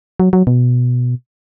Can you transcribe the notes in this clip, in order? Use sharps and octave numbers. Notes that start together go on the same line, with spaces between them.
F#3
F#3
B2